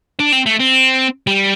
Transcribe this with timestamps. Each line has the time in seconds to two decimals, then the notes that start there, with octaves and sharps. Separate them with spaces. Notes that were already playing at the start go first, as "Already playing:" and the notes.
0.20 D4
0.32 C4
0.46 A3
0.60 C4
1.27 G3